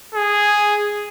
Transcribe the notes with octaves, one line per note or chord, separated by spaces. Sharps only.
G#4